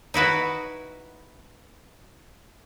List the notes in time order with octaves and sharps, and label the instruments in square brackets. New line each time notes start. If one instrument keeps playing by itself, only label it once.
[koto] D#4 E4 F#4 B4